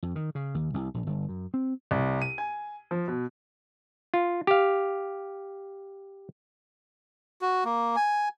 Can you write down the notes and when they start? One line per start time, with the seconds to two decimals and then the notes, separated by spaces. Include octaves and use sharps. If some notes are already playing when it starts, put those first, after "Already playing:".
0.03 F2
0.16 D#3
0.35 C#3
0.54 D#2
0.74 C2
0.94 A#1
1.07 G1
1.29 F#2
1.54 C4
1.91 C2
2.22 D#7
2.38 G#5
2.91 F3
3.08 B2
4.14 F4
4.47 G4 F5
7.42 F#4
7.65 A#3
7.96 G#5